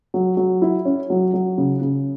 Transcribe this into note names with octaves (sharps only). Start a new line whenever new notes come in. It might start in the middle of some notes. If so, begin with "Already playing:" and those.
F#3
F#3
E4
C#4
F#3
F#3
C#3
C#3